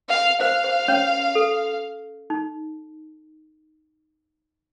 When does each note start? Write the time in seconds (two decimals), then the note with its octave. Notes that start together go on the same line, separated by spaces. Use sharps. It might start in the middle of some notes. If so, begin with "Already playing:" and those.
0.09 F5
0.41 C5 F5
0.64 C5
0.88 C#4 C#5
1.35 A4
2.30 D#4